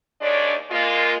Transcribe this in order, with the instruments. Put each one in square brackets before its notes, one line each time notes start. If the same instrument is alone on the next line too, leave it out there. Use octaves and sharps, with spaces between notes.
[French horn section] D#2 G#3 D4 C#5 D5
G#3 A#3 F4